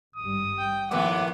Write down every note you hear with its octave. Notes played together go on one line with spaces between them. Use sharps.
G#1 G2 G3 D#6
G5
D#2 A2 F3 B3 F#5 D6